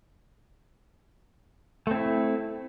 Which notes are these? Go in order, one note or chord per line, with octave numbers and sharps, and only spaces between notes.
A3 C4 E4